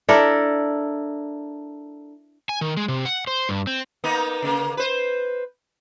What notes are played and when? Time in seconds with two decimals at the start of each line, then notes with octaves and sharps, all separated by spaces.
0.09 D4 E4 A4 A#4
2.49 G#5
2.61 D#3
2.77 G#3
2.88 C3
3.05 F#5
3.27 C5
3.49 G2
3.67 C4
4.04 A#3 B3 D#4
4.42 C#3 A#3
4.77 B4 C5